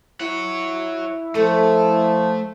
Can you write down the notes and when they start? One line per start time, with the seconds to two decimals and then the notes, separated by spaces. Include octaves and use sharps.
0.20 E4 C#5 F#5
1.35 F3 A3 A4